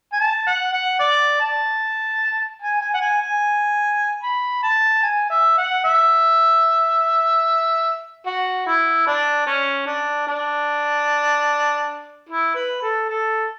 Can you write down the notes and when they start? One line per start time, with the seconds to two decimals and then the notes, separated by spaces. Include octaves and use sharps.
0.13 G#5
0.20 A5
0.47 F#5
0.73 F#5
1.00 D5
1.41 A5
2.62 G#5
2.81 G#5
2.94 F#5
3.01 G#5
3.22 G#5
4.23 B5
4.63 A5
5.03 G#5
5.30 E5
5.58 F#5
5.85 E5
8.26 F#4
8.66 E4
9.07 D4
9.47 C#4
9.86 D4
10.27 D4
12.29 E4
12.55 B4
12.82 A4
13.09 A4